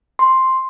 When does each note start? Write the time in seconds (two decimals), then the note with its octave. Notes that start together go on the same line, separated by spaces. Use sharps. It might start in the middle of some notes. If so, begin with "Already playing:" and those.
0.19 C6